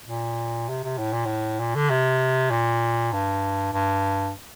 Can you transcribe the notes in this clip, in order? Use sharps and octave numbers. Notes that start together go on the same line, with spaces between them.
A#2
C3
C3
A2
A#2
A2
A#2
D3
C3
A#2
G2
G2